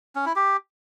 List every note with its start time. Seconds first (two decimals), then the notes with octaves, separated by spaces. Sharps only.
0.16 C#4
0.26 E4
0.36 G4